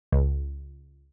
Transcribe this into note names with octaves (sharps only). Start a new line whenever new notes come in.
C#2